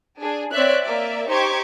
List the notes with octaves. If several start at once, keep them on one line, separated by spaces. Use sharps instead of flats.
D4 G#4
C4 C#5 D5 E5 F#6
A#3 D5 E5
D#4 G4 C5 C#6 D6 G#6